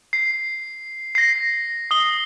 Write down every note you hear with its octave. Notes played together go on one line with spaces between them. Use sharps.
C7
A#6 C7
D#6 G7